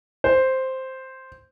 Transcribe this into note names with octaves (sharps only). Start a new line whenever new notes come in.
C5